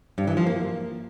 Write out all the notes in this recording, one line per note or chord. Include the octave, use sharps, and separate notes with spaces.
G2
E3
F3
A#3